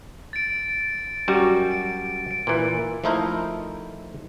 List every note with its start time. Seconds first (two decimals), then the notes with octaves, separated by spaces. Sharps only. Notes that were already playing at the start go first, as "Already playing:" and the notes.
0.33 A6 D7
1.28 F#2 G3 F#4
1.71 D7
2.31 D7
2.47 A#2 E3
3.04 F3 A3 D#4 E4 A#4 C5